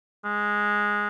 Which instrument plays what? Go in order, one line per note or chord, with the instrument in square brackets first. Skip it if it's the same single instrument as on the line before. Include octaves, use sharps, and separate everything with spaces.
[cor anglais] G#3